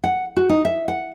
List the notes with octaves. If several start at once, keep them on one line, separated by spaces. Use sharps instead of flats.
F#5
F#4
D#4
E5
F#5